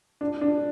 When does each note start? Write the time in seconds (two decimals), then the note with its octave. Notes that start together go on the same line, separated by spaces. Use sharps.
0.21 D4
0.41 D4